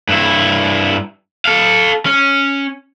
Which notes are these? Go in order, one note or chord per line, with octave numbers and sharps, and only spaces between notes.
G2 E4
A4 F5
C#4